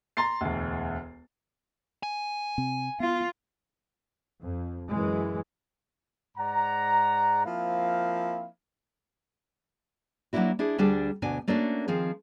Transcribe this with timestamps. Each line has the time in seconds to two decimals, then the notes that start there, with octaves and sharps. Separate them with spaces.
0.17 A#5 C6 A6 C7
0.41 E1 D2
2.03 G#5
2.58 C3 C4
3.00 B3 F4
4.41 F2
4.89 F#2 E3 G#3
6.38 G#2 D5 F#5 A#5
7.46 F3 A#3 C4 E4 F5
10.33 F#3 A#3 C#4 D4 E4 F#4
10.59 D4 E4 G#4
10.78 D2 G3 D4 G#4 A4
11.22 D2 B2 D4 G#5
11.48 A3 A#3 C#4 D4 F#4 A4
11.88 D#3 F3 C4 G#4